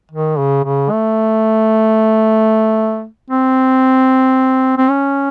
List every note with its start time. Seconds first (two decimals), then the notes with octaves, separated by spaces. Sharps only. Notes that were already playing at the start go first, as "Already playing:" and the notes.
0.11 D#3
0.38 C#3
0.64 C#3
0.90 A3
3.30 C4
4.78 C4
4.90 C#4